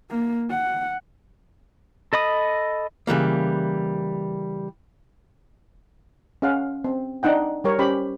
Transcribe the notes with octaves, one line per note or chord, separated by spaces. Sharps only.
A#3
F#5
A4 D#5 B5 D#6
C#3 E3 G3 A#3
C#4 G#4 F5 F#5
C4
D4 D#4 F#5 G5
G3 G4 A#4 C#5
C#4 G4 C5 B5